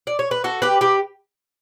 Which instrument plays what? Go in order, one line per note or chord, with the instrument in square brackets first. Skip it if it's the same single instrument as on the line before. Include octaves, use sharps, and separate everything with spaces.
[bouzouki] D5
C#5
B4
F#4 A4
G4 B4
G4 B4